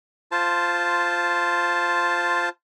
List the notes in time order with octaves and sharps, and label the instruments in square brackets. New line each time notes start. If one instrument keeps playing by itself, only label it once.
[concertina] F4 C5 A5